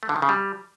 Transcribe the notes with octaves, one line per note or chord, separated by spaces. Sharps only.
A3
D3
D#3
C#3
G3